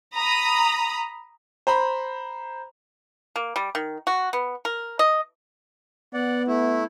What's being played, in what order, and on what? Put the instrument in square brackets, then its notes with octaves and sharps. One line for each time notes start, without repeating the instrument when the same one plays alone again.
[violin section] A#5 B5 D#6
[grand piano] C5 A#5 B5
[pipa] A#3
G3
D#3
F#4
B3
A#4
D#5
[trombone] B3 [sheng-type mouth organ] D5 F#5
[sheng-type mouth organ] A3 E4